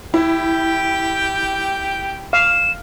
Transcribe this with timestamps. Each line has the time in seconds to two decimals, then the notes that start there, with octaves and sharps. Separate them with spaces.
0.14 E4 G4 G5
2.33 F5 E7